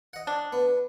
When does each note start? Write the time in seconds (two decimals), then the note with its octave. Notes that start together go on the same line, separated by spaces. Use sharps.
0.13 D#5 F#5
0.27 D4
0.53 B3